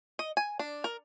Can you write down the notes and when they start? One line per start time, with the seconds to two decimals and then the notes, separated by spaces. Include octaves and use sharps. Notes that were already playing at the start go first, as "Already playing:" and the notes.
0.19 D#5
0.37 G#5
0.59 D4
0.84 A#4